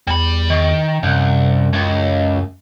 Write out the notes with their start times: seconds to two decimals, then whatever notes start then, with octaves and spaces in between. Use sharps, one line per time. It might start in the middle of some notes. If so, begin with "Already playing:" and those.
0.07 E2 G3 B5
0.50 D#3
1.03 C2 F#2
1.73 C#2